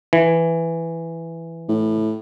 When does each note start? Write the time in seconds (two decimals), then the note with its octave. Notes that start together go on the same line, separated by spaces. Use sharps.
0.13 E3
1.69 A2